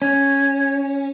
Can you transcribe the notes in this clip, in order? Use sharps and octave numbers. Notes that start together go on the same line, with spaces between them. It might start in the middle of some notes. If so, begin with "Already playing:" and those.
C#4 G#6